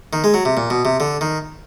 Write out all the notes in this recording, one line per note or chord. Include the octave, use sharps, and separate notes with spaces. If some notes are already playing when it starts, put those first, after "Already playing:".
D#3
G#3
F#3
C3
A#2
B2
C3
D3
D#3